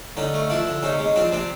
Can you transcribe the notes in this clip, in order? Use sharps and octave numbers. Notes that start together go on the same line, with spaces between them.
D3 C#4 D#4
A3
F3 D4 E4
D3
C3 C#4 D#4
G#3
F3 C4 D4
C3 C4 D4